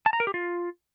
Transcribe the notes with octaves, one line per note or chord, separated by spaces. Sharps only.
A5
A#5
A#4
G4
F4